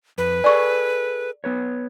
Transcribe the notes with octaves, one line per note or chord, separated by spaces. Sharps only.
F2 B4
G#4 A4 D5 G#5 C#6
B3 B4 C#5